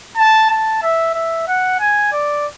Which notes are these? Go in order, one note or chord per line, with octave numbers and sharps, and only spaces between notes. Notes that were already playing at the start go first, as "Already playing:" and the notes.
A5
A5
E5
E5
F#5
G#5
D5